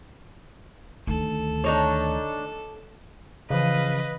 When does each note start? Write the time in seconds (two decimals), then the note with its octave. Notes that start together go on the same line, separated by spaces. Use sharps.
1.07 D2 D#3 A4
1.64 D4 D#4 C#5
3.50 C#3 E3 F3 B4 D#5 F5